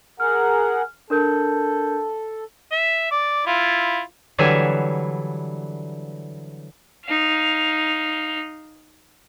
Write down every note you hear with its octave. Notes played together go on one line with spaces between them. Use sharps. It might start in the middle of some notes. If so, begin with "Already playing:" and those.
G#4 A#4 F#5 F6
D4 A4 A#4 G6
E5
D5
E4 F4
D3 E3 F#3 G3 E5 G#5
D#4 F5